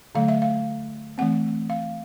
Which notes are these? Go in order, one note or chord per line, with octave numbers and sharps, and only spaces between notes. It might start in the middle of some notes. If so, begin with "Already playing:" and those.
D3 F#3 A3 F5
E5
F5
E3 A3 C4 F#5
F5